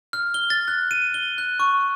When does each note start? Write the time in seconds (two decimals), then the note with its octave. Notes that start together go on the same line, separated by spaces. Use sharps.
0.13 F6
0.34 G7
0.50 A6
0.68 F#6
0.91 D#7
1.14 G7
1.38 F#6
1.60 C#6